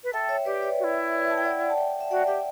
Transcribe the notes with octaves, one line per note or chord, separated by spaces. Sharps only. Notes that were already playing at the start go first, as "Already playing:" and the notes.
B4
A4 E5 G5
C#5 E5
G4 B4 D5
C#5 E5
F#4
E4
A5
G5
D5 F#5
A5
E5 G5
E5
F#4 D5 F#5
G4 E5 G5